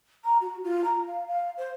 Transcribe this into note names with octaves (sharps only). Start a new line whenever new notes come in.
A#5
F#4
F4
A#5
F5
F5
C5